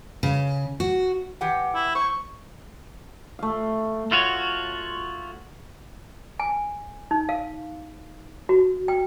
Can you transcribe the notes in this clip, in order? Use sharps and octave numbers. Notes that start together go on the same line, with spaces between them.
C#3
F#4
E3 G4 F#5
E4
C5 C#6
A3 F5
A3 F4 F#4 C#5
G#5
D#4
F5
F#4
G5